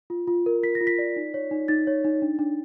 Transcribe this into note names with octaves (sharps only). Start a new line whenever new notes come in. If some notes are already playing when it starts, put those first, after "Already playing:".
F4
F4
A#4
F4 B6
A#6
F4
B6
D5
D#4
C#5
D#4
D#4 A6
C#5
D#4
D4
D4